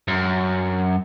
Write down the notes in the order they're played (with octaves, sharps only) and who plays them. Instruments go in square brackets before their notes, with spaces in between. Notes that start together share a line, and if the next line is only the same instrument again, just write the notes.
[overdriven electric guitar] F#2